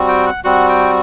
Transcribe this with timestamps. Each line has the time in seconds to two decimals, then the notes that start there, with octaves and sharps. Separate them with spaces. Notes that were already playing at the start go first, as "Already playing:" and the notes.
Already playing: G3 C4 F#4
0.08 G5
0.26 F#5
0.44 G3 C4 F#4 F#5
0.69 G5